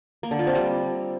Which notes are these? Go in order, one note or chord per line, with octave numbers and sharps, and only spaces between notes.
A#3
D3
F4
C4
G3